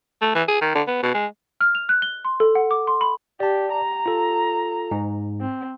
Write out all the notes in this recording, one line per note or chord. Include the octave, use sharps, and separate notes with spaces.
A3
E3
G#4
D#3
D3
B3
B2
G#3
F6
F7
F#6
G7
C6
A4
F#5
D6
C6
B5
G4 D5 A5
A#5
F4 A4
G#2
C4